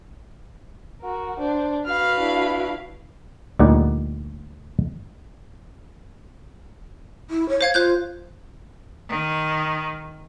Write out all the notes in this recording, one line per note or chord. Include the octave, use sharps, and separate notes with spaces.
F#4 A#4
D4 C5
F#4 B4 F5 F6
D4 E4
D2 A#2 G3 D#4 D5 F#5
E4
C#5
C5 F5 G#6
F4 C5 F#6 G6
D#3